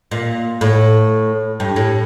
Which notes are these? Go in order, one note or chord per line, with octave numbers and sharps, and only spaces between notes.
A#2
A2
G2
A2